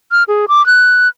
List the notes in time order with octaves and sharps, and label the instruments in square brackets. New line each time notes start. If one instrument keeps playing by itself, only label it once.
[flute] F6
G#4
D6
F#6